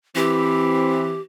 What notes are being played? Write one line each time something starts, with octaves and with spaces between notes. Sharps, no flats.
E3 C4 G4